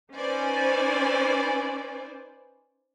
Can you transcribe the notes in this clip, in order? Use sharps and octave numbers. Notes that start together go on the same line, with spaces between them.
C#4 D#4 B4 C5 D5 G#5